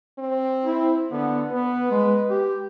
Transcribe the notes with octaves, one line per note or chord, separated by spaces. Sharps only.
C4
E4
D3 B3
B3 B4
G#3
G4